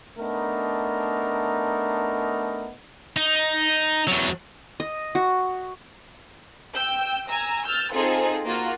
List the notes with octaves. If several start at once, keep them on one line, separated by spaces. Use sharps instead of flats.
A3 B3 D4 D#4 A#4
D#4
E2 F#3
D#5
F#4
G5 E6 G6
G#5 A#5 E6
E6 F6 G6 A6
C4 D#4 F4 G#4 A4 C5
A#3 F4 F#4